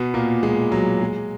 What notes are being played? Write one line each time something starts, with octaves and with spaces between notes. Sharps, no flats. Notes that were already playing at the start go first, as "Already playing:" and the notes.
Already playing: B2 B3
A#2 A#3
G#3
F#3
G#3